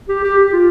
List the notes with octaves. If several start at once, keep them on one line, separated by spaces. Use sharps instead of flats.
G4
G4
G4
F4